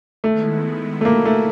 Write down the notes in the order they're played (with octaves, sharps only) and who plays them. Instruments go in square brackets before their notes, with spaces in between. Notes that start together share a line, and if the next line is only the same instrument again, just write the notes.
[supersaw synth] D#3 G#3 B3 E4 [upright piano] A3
[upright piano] A3
A#3
A3